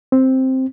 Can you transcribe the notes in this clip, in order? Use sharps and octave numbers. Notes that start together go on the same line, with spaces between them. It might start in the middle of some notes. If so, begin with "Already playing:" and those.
C4